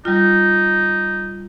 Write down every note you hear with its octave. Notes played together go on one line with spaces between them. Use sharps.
G3 D#4 F4